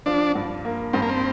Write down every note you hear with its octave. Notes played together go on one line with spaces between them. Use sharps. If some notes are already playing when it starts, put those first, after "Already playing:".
F3 D4
G2
A#3
G2 C4
A#3
C4